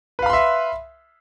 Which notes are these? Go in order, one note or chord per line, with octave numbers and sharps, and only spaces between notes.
B4 E5 F5 B5 C6